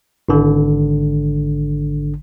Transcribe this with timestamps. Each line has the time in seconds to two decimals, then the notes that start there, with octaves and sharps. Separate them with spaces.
0.29 G#1 D3